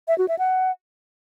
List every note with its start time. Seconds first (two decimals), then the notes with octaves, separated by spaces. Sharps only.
0.08 E5
0.18 F#4
0.28 E5
0.39 F#5